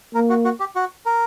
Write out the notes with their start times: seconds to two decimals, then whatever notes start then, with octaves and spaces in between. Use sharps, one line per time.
0.15 A#3 A#4
0.30 F#4
0.45 F#4
0.60 G4
0.76 F#4
1.06 A#4